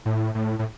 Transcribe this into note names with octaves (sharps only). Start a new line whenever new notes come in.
A2
A2
A2